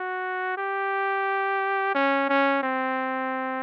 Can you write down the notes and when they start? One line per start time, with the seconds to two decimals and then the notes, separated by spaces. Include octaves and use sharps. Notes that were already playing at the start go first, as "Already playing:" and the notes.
Already playing: F#4
0.58 G4
1.95 C#4
2.29 C#4
2.63 C4